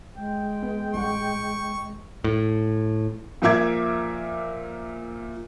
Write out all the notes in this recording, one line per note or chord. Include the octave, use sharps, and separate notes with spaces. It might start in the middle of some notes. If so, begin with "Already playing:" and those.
G#3 G5
B3
A1 G3 F#5 C#6
A2
A#2 F3 A#4 E5 D6 G#6